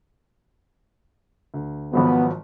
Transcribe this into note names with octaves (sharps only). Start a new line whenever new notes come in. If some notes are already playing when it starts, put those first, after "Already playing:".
D2
G#1 F3 F#3 B3